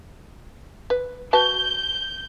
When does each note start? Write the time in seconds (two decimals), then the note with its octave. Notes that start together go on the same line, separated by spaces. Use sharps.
0.90 B4
1.33 F#4 B4 A5 G6